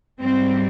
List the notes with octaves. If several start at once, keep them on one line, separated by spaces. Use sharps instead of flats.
G#2 G3 C4